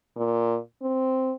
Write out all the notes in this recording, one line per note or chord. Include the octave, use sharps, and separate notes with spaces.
A#2
C4